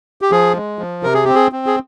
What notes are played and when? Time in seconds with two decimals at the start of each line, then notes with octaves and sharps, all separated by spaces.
0.22 G4
0.31 F3 G#4
0.56 G#3
0.79 F3
1.03 C3 A#4
1.14 G#4
1.24 C4 G4
1.35 G#4
1.52 C4
1.66 G#4